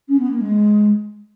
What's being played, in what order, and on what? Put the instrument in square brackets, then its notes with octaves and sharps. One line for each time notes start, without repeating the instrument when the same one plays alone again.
[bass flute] C#4
B3
A#3
G#3